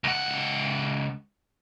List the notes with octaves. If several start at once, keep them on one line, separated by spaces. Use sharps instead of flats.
C#2 F#5